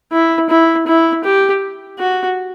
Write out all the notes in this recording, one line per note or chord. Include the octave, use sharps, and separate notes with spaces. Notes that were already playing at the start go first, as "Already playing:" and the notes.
E4
E4
E4
G4
F#4